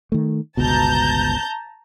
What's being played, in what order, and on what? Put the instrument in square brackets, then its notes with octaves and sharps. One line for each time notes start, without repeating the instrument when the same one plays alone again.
[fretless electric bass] D#3 A3
[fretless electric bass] G1 C#2 B2 [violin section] A5 A#5 G6